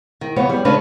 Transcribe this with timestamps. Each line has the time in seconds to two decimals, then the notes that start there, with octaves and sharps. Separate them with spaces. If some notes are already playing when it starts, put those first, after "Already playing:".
0.21 D#3
0.36 F2 C#3 B3 C#5
0.50 G3
0.65 C#3 G#3 C#4 D4 B4